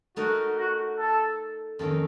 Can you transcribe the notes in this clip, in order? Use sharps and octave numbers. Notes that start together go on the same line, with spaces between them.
A3 D#4 F#4 A#4 D#5
F#4
A4
F2 D#3 A#3 C#4 A4